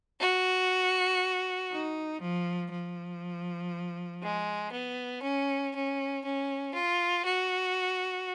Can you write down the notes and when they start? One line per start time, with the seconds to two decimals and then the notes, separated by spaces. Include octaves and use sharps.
0.19 F#4
1.70 D#4
2.21 F3
2.71 F3
4.22 G#3
4.72 B3
5.22 C#4
5.73 C#4
6.24 C#4
6.74 F4
7.24 F#4